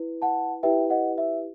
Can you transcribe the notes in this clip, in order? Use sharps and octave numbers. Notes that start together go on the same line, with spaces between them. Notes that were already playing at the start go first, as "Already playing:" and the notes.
Already playing: E4 B4
F#5 A5
E4 G4 B4 E5 G5
D#5 F#5
E5